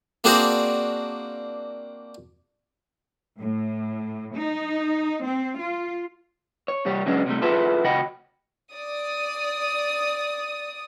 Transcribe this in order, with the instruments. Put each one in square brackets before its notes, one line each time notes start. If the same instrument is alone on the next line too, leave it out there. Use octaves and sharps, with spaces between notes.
[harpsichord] A#3 C4 D4 F#4 G#4 C5
[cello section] A2
D#4
C4
F4
[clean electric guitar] C#5
C2 G3 G4 C#5
C#3 F#3 G#3 B3 C#4 D4
C3 G3 A3
E4 F4 G#4 A4 B4 E5
C#3 F#4 D#5 F#5 G5 B5
[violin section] D5 D#6